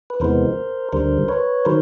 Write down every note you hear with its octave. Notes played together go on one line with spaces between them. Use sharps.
B4
E2 C3 E3 G#3 B3 A#4 C5
D2 D3 G3 A#4 C5
B4 C#5
D#3 F#3 A#4 C5